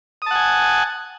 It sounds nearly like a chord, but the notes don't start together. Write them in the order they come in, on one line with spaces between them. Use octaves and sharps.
D#6 A5 F#5 G#5